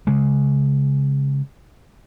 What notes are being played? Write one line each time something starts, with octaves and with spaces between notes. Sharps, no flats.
C#3 G#3